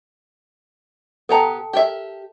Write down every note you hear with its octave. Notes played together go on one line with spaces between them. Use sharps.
B3 G4 A4 G5 A5 A#5
G4 A#4 E5